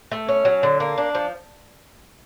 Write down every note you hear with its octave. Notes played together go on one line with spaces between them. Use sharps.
A3
C#4
F#3
D3
A#3
D4
F3